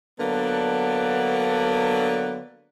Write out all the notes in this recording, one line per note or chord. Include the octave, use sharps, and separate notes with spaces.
D3 F#3 A#3 B3 D4